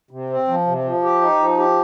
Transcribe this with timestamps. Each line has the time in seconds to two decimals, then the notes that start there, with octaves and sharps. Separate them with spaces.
0.11 C3
0.30 C4
0.48 F3
0.67 C3
0.85 F3
1.03 G4
1.21 D#4
1.40 F3
1.58 G4